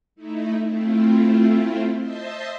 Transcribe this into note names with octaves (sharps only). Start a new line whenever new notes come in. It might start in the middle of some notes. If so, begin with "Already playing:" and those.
A3 D#4 E4
A3 C4 E4 F4
C5 D#5 E5 A5 C6